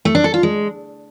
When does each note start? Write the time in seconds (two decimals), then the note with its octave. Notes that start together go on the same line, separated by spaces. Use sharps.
0.05 A3
0.15 D4
0.24 A4
0.34 F4
0.43 G#3